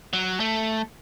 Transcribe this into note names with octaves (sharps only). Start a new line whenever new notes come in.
F#3
A3